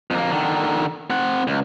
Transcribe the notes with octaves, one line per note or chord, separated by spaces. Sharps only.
F2 A#3
D3 D#3
C4 F#5
C#2